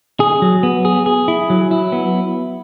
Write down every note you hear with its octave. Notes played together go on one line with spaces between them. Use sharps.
G#4
F#3
B3
G#4
G#4
E4
F#3
E4
B3